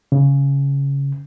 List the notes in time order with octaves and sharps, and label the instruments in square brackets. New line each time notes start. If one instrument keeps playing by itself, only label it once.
[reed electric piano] C#3